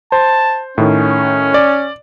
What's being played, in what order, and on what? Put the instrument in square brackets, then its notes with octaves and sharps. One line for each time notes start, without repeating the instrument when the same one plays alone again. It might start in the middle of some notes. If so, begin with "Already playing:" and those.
[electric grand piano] C5 [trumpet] A5
[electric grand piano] A2 D#3 [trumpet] C#4
[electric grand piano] D5